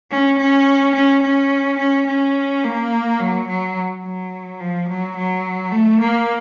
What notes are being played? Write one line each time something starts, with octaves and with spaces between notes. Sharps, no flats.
C#4
C#4
C#4
C#4
C#4
C#4
A#3
F#3
F#3
F#3
F3
F#3
F#3
A3
A#3